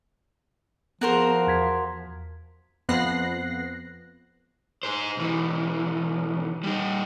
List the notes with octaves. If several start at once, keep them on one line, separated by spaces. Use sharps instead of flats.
F3 B3 F#4 G#4 A#4 C5
E2 G#6 B6
F2 F3 B3 F#6 A#6 C7
G#4 C5
B1 E3
G3 D#4